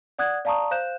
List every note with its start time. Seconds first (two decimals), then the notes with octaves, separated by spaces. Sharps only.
0.19 D5 F#5 D#6 F#6 G#6
0.45 D5 F5 A5 A#5 C#6 D#6
0.71 C5 F5 F#6 G6 E7